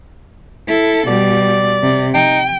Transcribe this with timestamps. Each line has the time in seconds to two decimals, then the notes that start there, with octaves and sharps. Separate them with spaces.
0.68 E4 A4
1.07 B2 G3 D5
1.83 C3
2.14 D#4 G5